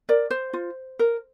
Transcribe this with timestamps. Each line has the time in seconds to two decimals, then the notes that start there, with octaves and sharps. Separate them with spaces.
0.09 A#4 D5
0.30 C5
0.53 F4
0.99 A#4